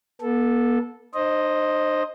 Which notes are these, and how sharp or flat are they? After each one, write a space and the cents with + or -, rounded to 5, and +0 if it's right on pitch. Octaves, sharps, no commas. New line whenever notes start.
B3 -45 A4 -10
D#4 -45 C5 +10 D#5 +0